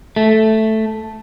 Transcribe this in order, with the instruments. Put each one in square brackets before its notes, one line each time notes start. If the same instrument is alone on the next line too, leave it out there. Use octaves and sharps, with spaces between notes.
[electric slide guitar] A3